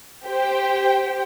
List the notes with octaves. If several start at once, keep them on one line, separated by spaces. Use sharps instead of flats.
G4 C5 G5